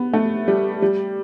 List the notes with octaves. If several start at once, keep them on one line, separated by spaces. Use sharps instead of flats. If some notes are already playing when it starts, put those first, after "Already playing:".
Already playing: B3
A3
G3
G3